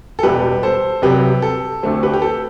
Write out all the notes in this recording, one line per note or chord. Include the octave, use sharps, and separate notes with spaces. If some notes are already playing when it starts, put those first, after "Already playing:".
A4
E1 E2 B2 G3 G4 B4
A4 C5
C2 C3 F#3 G4 B4
A4
D2 D3 A3 C4
G4 B4
G4
A4